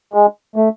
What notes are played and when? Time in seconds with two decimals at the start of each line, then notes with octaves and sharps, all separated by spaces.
0.14 G#3
0.56 A3